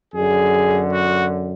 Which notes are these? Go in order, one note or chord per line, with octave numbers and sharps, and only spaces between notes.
F#2 D3 G#4
F#4